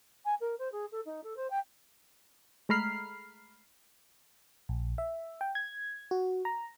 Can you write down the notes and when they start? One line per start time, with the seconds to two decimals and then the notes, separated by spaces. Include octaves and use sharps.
0.25 G#5
0.40 A#4
0.59 C5
0.72 G#4
0.92 A4
1.05 D#4
1.24 A4
1.36 C5
1.50 G5
2.69 G#3 A3 A#5 B5 F6 C7
4.69 A#1
4.98 E5
5.41 G5
5.55 G#6
6.11 F#4
6.45 A#5